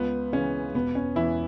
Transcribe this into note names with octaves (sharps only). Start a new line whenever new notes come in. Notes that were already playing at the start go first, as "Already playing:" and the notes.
Already playing: C#2 B3
C#3 E3 C#4
E1 B3
C#4
E2 E3 E4